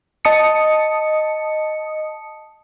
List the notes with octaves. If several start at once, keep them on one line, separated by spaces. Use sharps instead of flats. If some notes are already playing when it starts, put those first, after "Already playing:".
D#5 A5 D#6 C#7